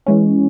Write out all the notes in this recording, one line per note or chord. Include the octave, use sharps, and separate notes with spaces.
E3 G#3 C#4